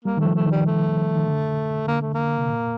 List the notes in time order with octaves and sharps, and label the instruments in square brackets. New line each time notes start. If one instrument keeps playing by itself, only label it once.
[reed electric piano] G3 [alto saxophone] A#3
[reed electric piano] D#3 [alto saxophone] A3
[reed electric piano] F3
[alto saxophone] A3
[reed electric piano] D#3 [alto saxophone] G3
[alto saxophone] A3
[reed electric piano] D#3
D3
[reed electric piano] D3 [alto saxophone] A#3
[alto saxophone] A3
[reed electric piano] D3 [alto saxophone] A#3
[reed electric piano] C3
A#2